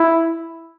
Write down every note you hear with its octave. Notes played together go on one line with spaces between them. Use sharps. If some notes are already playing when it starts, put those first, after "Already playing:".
Already playing: E4